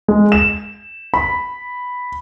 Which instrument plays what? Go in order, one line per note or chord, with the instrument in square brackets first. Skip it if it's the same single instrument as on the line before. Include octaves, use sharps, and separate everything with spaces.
[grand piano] G#3
E7
B5